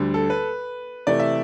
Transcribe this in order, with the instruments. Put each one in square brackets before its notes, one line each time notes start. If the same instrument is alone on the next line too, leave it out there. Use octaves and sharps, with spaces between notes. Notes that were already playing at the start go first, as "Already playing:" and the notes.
Already playing: [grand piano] D2 D3 G3
[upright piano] A4
B4
[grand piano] C3 E3 A3 [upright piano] D5
[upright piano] E5